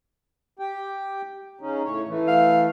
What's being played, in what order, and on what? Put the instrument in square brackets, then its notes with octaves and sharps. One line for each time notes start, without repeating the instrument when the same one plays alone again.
[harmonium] G4 G5
C#3 C#4 D#4
A2 C#5
E3 A3
[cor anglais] F5